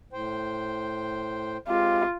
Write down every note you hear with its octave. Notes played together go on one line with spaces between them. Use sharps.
A2 C5 G5
G#3 C4 F4 G4